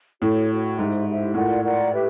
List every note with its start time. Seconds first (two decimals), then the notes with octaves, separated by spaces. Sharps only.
0.22 A2 F#4 A4 C#5
0.50 F#4 A4 C#5
0.78 G#2 E4 G4 C5 E5
1.07 E4 G4 C5 E5
1.34 A2 F4 A#4 D5 F#5
1.63 F4 A#4 D5 F#5
1.91 G4 B4 E5